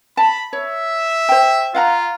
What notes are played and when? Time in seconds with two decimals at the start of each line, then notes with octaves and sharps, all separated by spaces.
0.17 A5 B5
0.53 C#5 E5
1.29 C5 G5
1.75 F4 F5 F#5 A#5